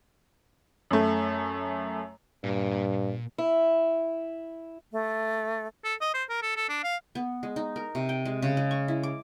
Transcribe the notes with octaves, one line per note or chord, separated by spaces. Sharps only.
F#2 A3
G2 A#2
E4
A3
A4
D#5
C5
A#4
A4
A4
D4
F5
B3
G#3
D#4
A#4
C3
G5
G#3
C#3
G#3
C#6
E4
D6